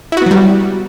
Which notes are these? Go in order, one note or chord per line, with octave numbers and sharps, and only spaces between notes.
F#3 G3 B3 E4 F#4